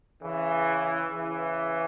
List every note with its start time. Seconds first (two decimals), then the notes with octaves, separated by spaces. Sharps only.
0.22 C#3 E3
1.10 C#3 E3